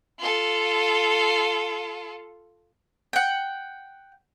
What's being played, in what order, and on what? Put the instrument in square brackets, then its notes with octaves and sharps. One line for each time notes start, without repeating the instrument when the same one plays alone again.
[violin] F4 A4
[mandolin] F#5 G5